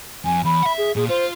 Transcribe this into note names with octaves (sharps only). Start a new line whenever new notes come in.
F2 G#5
E2 B5
E5 F#5
G#4
A#2 G#4
F4 C5